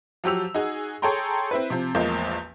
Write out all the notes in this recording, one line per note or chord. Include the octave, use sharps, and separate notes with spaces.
F3 F#3 G4 E6 F7
D#4 F#4 G#4
G#4 A4 C#5 G5 A#5 C6
C4 E4 B4
C3 F3
A1 E2 F3 G#3 A#3 G6